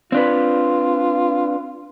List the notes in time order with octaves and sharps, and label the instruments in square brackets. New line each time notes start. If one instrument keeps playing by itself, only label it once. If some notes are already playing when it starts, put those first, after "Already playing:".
[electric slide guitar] C4 D4 B4 [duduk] F4